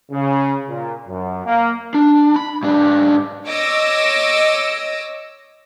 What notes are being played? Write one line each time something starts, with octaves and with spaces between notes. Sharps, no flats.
C#3
A#2
F#2
A#3
D4
B5
G#2 D4
C#5 D#5 D6 E6 A#6